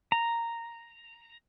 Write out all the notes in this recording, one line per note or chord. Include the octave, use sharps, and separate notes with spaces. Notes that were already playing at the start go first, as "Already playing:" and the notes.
A#5